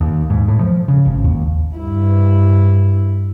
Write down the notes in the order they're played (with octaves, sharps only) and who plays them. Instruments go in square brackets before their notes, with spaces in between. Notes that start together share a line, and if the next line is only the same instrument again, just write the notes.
[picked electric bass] D#2
G#2
A2
F3
C#3
G#1
D#2
[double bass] G2 E4